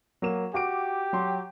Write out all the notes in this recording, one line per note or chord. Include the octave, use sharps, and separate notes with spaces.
F#3 A#3 E7
F#4 G4 D6 D7
F#3 C6